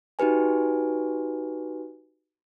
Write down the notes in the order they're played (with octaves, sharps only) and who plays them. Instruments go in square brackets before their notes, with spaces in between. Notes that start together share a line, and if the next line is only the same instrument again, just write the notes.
[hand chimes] D#4 F#4 G4 B4 G#5